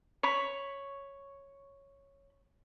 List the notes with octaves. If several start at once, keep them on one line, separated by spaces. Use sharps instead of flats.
C#5 B5